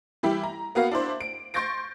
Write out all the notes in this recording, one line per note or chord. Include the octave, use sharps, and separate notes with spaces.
E3 G3 E4 G4
A#5
A#3 B3 F#4 F5
D4 E4 C5
D7
C6 C#6 G6 A6 A#6 D7